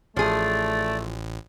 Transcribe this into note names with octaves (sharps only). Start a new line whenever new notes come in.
A1 F3 A3 G#4 D5